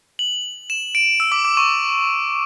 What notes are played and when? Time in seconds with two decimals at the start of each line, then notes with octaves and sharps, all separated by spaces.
0.19 F#7
0.70 E7
0.95 D7
1.20 E6
1.32 D6
1.45 D6
1.57 C#6